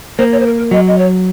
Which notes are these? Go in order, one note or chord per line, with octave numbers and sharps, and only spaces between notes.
A#3 C5
C#5
C5
A#4
A#4
F#3 D#5
D#5
C#5